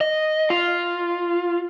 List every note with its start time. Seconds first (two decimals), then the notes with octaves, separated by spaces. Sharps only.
0.01 D#5
0.50 F4